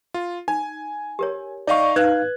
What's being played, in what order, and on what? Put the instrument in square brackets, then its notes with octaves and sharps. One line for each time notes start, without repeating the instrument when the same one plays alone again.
[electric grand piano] F4
[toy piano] D#4 [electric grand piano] G#5
[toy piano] G4 A#4 C#5
[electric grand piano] D#4 D#5 F5 [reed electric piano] D5 C#6
[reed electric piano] D#4 F5 [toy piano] B4 [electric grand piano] F#6 G#6